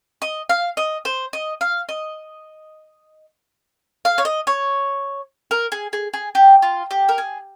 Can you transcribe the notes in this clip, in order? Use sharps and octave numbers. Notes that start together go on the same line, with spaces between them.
D#5
F5
D#5
C5
D#5
F5
D#5
F5
C#5
D#5
C#5
A#4
G#4
G#4
G#4
G4
F4
G4
A#4
G#4